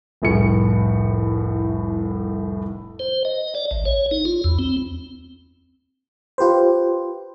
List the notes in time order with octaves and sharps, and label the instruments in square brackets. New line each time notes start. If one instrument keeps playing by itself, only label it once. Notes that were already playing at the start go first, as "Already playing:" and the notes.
[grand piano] F1 C2 A2 G#4 C#7
[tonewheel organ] C5
D#5
D5
A1
C#5
D#4
F4
E2
C4
[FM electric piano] F4 G4 B4 C5